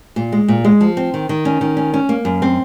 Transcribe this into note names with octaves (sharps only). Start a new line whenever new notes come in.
A#2
G#3
A#2
G#3
F3
C4
D#3
D#3
C#4
D#3
C#4
C#4
A#3
F#2
C4